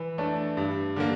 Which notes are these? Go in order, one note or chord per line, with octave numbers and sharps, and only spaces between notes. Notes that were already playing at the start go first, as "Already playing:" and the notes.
Already playing: E3
A3 D4 A4
G2
D3 G3 A#3